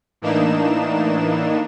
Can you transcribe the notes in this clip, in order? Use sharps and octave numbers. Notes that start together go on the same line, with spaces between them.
A2 E3 A#3 D4 D#4 E7